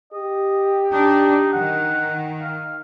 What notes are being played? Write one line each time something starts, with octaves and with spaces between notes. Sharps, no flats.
G4 D#5
D4 D#4
D#3 F#5
F5